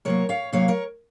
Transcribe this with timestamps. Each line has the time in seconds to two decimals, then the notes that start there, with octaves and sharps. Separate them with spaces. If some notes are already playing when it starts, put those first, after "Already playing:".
0.05 C3 F#3 A#3 A#4 C#5
0.29 C#5 F5
0.52 C3 F#3 A#3 C#5 F5
0.68 A#4 C#5